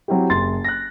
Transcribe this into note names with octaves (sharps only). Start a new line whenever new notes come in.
F#3 C4 E4 G4
F#1 C6 A6
F#6 A#6